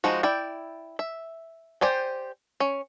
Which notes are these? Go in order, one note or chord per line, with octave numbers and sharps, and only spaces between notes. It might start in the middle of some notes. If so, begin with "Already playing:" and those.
F3 G#3 D#4 F#4
E4 D5 G5
E5
G4 C5 D5 G#5
C#4